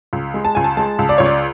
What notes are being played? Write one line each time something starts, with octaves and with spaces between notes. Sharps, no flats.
C#2
G#3
A5
C#2 G#5
A5
G#3 A5
C#2
D5
C#2 C#5
D5